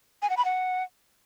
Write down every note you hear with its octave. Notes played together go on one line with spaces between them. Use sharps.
G#5
F#5
B5
F#5